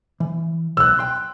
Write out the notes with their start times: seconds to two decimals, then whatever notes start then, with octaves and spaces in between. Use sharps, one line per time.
0.20 E3
0.77 B1 E6 F#6
0.99 G5 C6